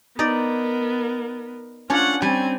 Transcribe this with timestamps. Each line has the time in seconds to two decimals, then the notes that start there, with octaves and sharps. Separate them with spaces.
0.19 B3 D#4 A#4 D5 D#5
1.90 C#4 D4 F4 C#5 F#5
2.22 G3 C4 G#5